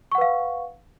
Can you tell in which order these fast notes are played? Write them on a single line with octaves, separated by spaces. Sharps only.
C#6 F#5 B4 F5